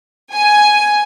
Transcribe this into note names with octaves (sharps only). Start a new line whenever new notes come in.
G#5